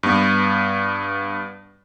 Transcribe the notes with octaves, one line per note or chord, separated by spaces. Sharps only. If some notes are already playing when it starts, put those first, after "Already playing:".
G2 B3